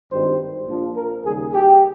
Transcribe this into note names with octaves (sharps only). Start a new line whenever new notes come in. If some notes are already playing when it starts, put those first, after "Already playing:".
G#1 G2 D#3 G3 C5
A#1 A#2 F3
A#4
D#2 C#3 G3 G#4
G4